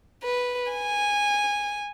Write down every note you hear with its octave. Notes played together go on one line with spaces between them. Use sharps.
B4
G#5